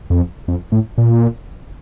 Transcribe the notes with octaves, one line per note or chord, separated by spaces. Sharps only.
F2
F2
A2
A#2